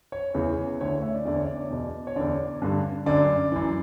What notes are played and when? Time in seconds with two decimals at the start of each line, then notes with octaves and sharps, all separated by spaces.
0.12 C#5
0.34 E2 C#3 E3
0.81 D2 D3 C#5
1.03 E5
1.15 D5
1.25 E2 D3 D5
1.36 C#5
1.47 D5
1.70 E2 B2
2.07 C#5
2.16 E2 D3 D5
2.62 G2 D3
3.06 F#2 D3 D5
3.52 F#2 E3